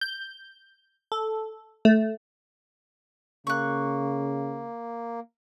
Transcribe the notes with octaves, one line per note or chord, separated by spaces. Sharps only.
G6
A4
A3
C#3 A#3 C#6 F#6